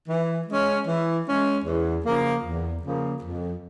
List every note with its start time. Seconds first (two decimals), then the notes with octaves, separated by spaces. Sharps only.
0.08 E3
0.47 G#3 C#4
0.87 E3
1.25 G#3 C#4
1.65 E2
2.04 C#3 F3 A#3
2.43 E2
2.83 C#3 F3 A#3
3.22 F2